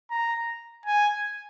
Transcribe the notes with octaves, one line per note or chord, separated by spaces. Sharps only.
A#5
G#5